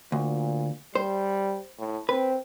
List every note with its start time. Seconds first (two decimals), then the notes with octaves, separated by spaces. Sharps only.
0.12 D2 A#2
0.95 G3 C5
1.79 A2
2.09 C4 B4